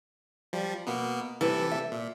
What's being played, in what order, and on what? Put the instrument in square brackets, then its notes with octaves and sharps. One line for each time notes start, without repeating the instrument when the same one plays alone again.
[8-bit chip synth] F3 G3
B2 A#3 B3
[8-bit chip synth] C3 A4 [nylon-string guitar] E3 G3
[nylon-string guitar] E5
[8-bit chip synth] A#2